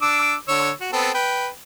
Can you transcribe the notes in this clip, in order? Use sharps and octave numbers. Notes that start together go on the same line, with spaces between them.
D4 D6 E6
D3 C#5 E6
F#4
B3 C4 A4
B4 G5